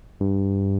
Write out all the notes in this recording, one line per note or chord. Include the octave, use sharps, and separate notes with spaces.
G2